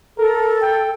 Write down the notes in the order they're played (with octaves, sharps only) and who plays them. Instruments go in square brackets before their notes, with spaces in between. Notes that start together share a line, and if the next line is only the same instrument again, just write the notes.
[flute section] A4 [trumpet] A#4
[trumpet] G5